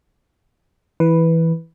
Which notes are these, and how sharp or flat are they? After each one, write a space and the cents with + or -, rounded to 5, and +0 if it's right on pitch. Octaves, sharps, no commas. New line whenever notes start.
E3 -10 B4 +0